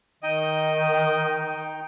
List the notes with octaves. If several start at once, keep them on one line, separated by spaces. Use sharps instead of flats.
D#3 D#4 D#5 G5